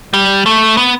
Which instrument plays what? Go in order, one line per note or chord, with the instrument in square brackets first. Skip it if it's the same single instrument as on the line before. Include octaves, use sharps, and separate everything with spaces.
[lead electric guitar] G3
A3
B3